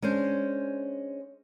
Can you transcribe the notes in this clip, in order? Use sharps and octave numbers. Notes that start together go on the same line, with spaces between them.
G#3 C#4 D4 C5